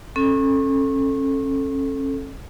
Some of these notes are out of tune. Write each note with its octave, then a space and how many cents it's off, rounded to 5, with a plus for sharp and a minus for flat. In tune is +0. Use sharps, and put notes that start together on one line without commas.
C#4 -35 A4 +0